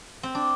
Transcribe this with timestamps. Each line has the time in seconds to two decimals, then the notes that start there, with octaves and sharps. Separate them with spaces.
0.23 C4
0.35 D4